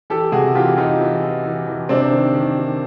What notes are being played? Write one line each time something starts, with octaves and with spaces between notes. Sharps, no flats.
E3 G4 A4
C3 F#4 G#4
E3 F4 G4
E3 D#4 F4
E3
E3
E3
E3
C3 C4 D4
D#3
D#3
D#3